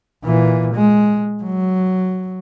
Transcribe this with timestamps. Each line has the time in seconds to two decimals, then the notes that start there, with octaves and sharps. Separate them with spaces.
0.24 A#2 E3
0.75 G#3
1.43 F#3